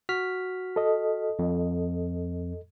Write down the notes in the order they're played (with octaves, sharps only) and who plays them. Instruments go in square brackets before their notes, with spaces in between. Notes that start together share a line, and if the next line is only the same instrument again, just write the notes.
[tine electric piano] F#4 F6 B6
[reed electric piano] A4 D#5
[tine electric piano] F2